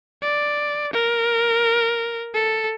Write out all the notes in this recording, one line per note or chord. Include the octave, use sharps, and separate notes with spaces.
D5
A#4
A4